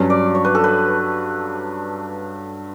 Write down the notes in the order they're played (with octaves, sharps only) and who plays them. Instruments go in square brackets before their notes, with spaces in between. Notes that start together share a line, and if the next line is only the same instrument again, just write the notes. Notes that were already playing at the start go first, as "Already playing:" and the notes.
Already playing: [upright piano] G2 F#3 C#4
[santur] D5
C#5
B4
A4
B4